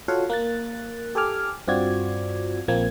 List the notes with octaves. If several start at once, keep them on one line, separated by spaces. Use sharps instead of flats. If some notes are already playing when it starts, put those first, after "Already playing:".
F4 F#4 A4 C#5 F5 F#5
A#3 F#6 A6
G4 A4 G#5 D6 F6
G2 C4 F4 F#4 D5 G#6
A#1 F3 A#3 C4 G#6